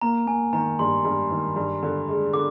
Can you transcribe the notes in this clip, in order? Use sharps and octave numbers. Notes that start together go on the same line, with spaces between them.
A#3 A#5
A#3 G#5
D#3 A#5
G2 C6
G2
D#3
G2
D3
G#3
D3 D6